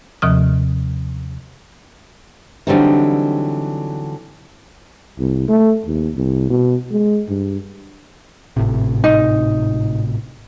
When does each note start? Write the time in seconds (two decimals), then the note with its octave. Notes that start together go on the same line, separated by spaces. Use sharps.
0.22 D#2 C3 F3 D#6
2.67 D3 E3 F#3 G3 C4 D#4
5.19 C2
5.48 A3
5.86 D#2
6.15 C2
6.50 B2
6.91 G#3
7.29 G2
8.57 G#1 A2 C3
9.04 D#4